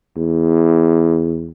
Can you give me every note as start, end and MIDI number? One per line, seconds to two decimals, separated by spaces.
0.17 1.51 40